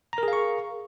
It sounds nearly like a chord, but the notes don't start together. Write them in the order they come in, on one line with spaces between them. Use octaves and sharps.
A#5 A#4 G#4 F5 C#6